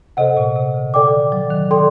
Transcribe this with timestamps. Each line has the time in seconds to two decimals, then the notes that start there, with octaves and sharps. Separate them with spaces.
0.17 C3 A4 C5 D#5 F#5
0.37 A#2
0.56 C3
0.74 D3
0.94 A4 D5 G5 D6
1.03 D3
1.13 D#3
1.32 F#3
1.51 D#3
1.71 A4 D5 G5 C6